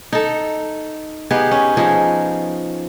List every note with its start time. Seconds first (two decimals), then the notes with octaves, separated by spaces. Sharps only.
0.13 D#4 A4
1.31 B3 D#4 G4 G#4
1.51 C#4
1.77 F3 D#4 G#4